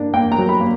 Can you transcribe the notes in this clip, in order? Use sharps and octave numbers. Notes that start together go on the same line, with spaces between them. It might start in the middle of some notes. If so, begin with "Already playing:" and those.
Already playing: A#3 D4
A#3 G5
A#5
F#3
B5
A#3